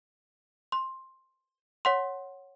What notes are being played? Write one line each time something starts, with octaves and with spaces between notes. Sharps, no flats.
C6
C#5 F#5 C6